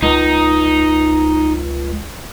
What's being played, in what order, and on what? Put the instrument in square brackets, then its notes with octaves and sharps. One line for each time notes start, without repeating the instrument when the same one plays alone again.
[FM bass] C#2 [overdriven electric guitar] D#4